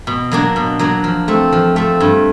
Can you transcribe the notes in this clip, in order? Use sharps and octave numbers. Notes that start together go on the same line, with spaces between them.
B2
F#3 A#3 D4
B2
F#3 A#3 D4
F3
A3 C4
F3
A3 C4
G2